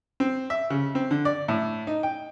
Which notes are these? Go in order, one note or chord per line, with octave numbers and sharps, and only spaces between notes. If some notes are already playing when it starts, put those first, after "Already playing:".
C4
E5
C#3
C4
D3
D5
A2
D#4
G5